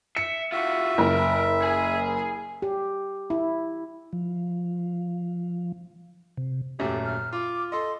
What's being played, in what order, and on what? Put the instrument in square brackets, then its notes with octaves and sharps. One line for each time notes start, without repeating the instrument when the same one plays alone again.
[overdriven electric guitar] E5 [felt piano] C#7
[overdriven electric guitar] F4 F#4 [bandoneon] E5
[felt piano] F#1 [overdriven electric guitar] A#4 B4
[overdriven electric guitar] G#4 G#5
[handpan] G4
E4
[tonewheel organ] F3
C3
[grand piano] D#1 F#2 A3 [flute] G4
[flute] F6
[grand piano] F4 [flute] D6
[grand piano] A4 D#5 [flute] C6